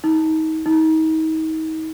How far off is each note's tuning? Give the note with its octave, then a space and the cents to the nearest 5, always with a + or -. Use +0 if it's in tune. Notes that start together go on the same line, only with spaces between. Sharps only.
D#4 +30
D#4 +35